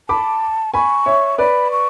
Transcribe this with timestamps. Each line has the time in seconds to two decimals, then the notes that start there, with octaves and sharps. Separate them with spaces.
0.09 A5 B5 D6
0.74 G#5 B5 C#6
1.06 C#5 E5
1.38 B4 D5 B5
1.71 C#6